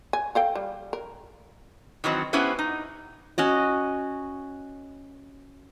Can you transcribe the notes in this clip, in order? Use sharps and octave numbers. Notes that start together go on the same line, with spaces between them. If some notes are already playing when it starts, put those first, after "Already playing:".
G#5
A4 F5 G5
G3
A#4
D#3 E3 F#3 C4
B3 C#4 E4 G4 B4 C5
D#4
C#4 F#4 D#5